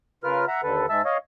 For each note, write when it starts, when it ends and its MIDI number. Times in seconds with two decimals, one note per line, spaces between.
0.24 0.45 49
0.24 0.45 65
0.24 0.45 70
0.24 0.45 71
0.24 0.45 89
0.48 0.61 76
0.48 0.61 78
0.48 0.61 82
0.63 0.86 39
0.63 0.86 50
0.63 0.86 69
0.63 0.86 71
0.90 1.02 44
0.90 1.02 56
0.90 1.02 76
0.90 1.02 81
0.90 1.02 88
1.05 1.17 73
1.05 1.17 75
1.05 1.17 77